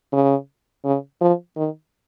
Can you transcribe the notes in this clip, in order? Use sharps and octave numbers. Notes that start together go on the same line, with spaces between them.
C#3
C#3
F3
D#3